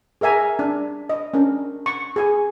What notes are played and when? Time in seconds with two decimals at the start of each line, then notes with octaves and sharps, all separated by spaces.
0.21 G#4 A#4 E5 G#5 A#5
0.59 D4
1.10 D#5
1.34 C#4 D4 A#4
1.86 C#6
2.16 G#4 G#5